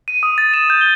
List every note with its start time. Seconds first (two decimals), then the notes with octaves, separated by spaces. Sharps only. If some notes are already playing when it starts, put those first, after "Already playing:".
0.08 D#7
0.23 D#6
0.38 A6
0.54 E7
0.70 G6
0.81 G7